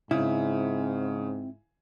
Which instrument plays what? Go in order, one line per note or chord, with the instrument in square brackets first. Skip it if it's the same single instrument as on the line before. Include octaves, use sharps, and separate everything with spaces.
[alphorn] G#2 [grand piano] C#3 [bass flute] C4 [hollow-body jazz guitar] E4